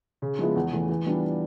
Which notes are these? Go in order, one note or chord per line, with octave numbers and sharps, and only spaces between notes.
C#3
F3 G#3 B3 E4
E2
C#3 E3 A3
E3
G3 B3 D4 F4